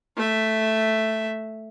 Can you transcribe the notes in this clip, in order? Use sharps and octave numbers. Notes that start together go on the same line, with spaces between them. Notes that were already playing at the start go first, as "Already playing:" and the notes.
A3 E5